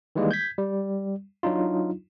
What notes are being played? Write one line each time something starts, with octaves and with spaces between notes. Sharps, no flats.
D#3 E3 G3 G#3 A#3
G6 G#6 B6
G3
F#3 D4 D#4 F4